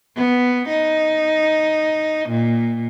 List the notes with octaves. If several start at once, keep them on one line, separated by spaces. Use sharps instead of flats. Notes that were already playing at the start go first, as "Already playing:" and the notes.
B3
D#4
A#2